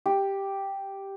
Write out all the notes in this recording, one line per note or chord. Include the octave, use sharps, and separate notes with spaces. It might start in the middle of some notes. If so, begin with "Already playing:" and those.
G4